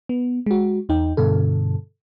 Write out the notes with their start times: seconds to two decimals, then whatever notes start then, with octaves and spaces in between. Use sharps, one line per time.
0.09 B3
0.46 G#3 F#4
0.89 E2 D#4 G5
1.17 G2 B2 D3 A4